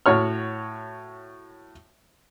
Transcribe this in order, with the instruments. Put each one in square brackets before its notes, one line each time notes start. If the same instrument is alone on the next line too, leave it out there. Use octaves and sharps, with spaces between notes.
[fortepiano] A2 F#4 C#5 F6